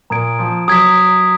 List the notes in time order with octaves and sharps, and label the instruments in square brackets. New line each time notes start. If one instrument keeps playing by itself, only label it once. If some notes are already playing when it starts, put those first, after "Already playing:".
[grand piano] A#2 [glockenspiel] A#5 D#6 G#6 D7
[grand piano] F3
[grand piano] F#3 [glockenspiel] D#6 G#6 B6